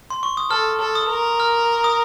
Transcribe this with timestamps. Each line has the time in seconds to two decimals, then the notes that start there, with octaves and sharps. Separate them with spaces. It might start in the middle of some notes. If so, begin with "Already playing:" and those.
0.10 C6
0.23 C#6
0.37 D#6
0.50 A4 F6
0.80 A4
0.95 D#6
1.10 A#4
1.40 F6
1.84 D#6